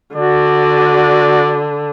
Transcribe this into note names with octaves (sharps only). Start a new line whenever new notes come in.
D3 F#4 D5